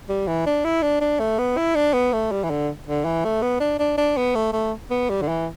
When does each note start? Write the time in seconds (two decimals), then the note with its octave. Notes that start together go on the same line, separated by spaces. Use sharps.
0.09 G3
0.27 E3
0.46 D4
0.65 E4
0.82 D4
1.01 D4
1.20 A3
1.39 B3
1.57 E4
1.75 D4
1.94 B3
2.13 A3
2.32 G3
2.44 E3
2.50 D3
2.87 D3
3.05 E3
3.25 A3
3.42 B3
3.60 D4
3.79 D4
3.98 D4
4.17 B3
4.35 A3
4.53 A3
4.90 B3
5.10 G3
5.22 D3
5.28 E3